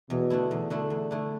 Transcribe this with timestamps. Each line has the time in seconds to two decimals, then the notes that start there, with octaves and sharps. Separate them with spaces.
0.10 E2 B2
0.30 D3 A3 E4
0.51 E2
0.70 D3 A3 E4
0.90 E2
1.11 D3 A3 E4